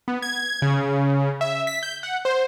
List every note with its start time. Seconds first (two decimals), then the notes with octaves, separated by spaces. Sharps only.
0.08 B3
0.22 G#6
0.62 C#3
1.41 E5
1.67 B6
1.83 G6
2.03 F#5
2.25 C5